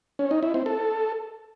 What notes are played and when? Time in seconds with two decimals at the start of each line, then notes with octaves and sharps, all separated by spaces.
0.19 C#4
0.31 D#4
0.43 E4
0.54 C4
0.66 A4